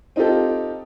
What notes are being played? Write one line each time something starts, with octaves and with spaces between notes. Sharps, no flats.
C4 D#4 F4 G4 A4